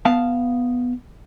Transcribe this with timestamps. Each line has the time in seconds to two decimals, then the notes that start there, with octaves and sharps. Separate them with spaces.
0.05 B3 F5 A5